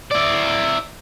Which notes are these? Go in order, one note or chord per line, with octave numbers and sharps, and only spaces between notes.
E4 D5